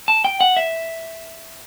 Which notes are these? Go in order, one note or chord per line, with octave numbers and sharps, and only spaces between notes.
A5
G5
F#5
E5